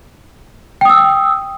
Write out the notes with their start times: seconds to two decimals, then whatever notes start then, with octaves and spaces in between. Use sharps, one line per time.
0.81 G5
0.85 D#6
0.89 E6